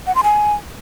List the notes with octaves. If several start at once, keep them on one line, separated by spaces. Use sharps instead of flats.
F#5
C6
G#5